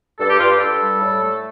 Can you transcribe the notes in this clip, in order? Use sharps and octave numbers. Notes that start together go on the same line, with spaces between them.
G2 A4
G4
G2 F4
G4
G2 A4
G3
A2
A3